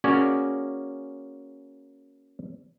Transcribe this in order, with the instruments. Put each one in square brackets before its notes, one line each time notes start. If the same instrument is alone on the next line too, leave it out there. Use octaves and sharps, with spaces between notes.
[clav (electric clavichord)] A#3 C#4 F#4 G#4 C#5 D5